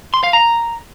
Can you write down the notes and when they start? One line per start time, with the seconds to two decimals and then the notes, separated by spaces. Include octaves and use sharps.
0.14 C6
0.23 F5
0.33 A#5